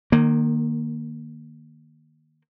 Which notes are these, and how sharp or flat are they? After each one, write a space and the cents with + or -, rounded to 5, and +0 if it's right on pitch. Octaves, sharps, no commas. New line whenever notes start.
D#3 -30 A#3 +0